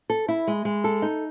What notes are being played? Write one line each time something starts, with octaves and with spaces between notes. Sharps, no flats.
A4
E4
G#3
G#3
A4
D#4